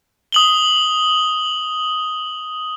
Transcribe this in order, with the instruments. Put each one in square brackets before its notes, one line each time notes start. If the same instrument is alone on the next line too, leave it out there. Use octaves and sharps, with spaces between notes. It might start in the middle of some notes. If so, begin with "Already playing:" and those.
[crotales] D#6 F#7 G7